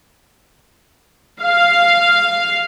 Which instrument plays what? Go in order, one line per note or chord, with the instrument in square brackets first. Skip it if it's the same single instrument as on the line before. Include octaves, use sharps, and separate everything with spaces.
[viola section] F5